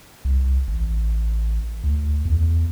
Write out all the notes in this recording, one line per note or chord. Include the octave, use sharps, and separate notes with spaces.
C2
A1
D2
E2